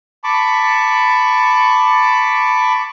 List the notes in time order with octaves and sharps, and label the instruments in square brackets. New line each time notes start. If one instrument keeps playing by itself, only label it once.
[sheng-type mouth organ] A5 B5 C#6 D6